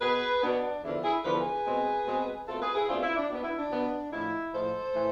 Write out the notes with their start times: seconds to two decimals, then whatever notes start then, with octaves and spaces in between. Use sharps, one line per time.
0.01 B2 B3 G#4 B4
0.42 B2 B3 D4
0.83 E2 D3 F3 E4
1.04 E4 G#4
1.24 E2 D3 F3 B4
1.33 A4
1.41 G#4 B4
1.66 B2 G#3 C4
2.07 B2 G#3 C4
2.47 B2 A3 C4 F4 A4
2.62 G#4 B4
2.75 E4 G#4
2.89 B2 A3 C4 D4 F4
3.03 E4
3.17 D4
3.30 B2 B3 D4
3.44 E4
3.57 D4
3.71 B2 B3
4.12 A2 F3 G#3 E4
4.53 A2 F3 G#3 A4 C5
4.95 A2 E3